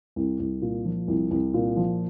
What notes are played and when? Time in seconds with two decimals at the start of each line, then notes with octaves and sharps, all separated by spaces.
0.16 C2
0.39 C2
0.62 A#2
0.85 F3
1.08 C2
1.31 C2
1.54 A#2
1.77 F3